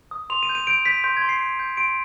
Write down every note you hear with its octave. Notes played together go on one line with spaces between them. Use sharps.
D#6
C6 F7
D#7
G6
D#7
G6 D7
G6 B6
C6 G6
G#6
C6
C7
G6
G6
C6 D7